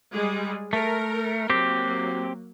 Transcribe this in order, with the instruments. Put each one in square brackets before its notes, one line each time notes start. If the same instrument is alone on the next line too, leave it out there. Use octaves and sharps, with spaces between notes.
[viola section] G3 G#3 G#4
[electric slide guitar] A3 [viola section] A#4
[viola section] F#3 A#3 [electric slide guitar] C4 G4